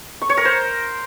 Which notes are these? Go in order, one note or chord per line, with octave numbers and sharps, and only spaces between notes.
C#6
C#5
A#4
C5